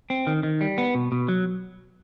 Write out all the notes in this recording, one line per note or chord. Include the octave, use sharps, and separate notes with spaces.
C4
D#3
D#3
G3
B3
B2
B2
F#3